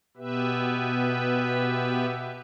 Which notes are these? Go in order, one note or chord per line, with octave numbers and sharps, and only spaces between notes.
B2 B3 G4 B4 E5